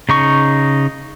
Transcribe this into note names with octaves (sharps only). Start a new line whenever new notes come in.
C#3 D#4 C#6